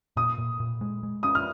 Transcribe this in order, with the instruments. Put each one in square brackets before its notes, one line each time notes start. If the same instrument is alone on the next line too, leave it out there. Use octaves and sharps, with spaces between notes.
[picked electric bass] A#2 [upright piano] D#6
[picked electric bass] A#2
A#2
G#3
G#3
[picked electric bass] C#4 [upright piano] D#6
[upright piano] F6